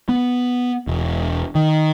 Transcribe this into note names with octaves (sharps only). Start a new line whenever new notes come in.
B3
E1
D#3